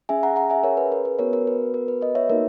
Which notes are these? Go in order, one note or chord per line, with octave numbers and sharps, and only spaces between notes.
C#4 G#4 E5 G#5
F#5 A#5
F#5 A#5
E5 G#5
A#4 C#5
B4
A#4
B4
B3 F#4 A#4 C#5
A#4
B4
A#4
B4
B4 D#5
C#5 E5
A#3 D#4 F#4 A#4